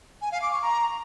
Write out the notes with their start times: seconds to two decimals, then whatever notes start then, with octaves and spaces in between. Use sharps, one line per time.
0.21 G#5
0.32 F5
0.42 D6
0.52 C#6
0.62 A#5